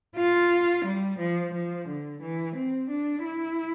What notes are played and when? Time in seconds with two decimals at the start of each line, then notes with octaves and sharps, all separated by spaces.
0.16 F4
0.85 G3
1.19 F3
1.54 F3
1.88 D3
2.22 E3
2.56 C4
2.90 D4
3.25 E4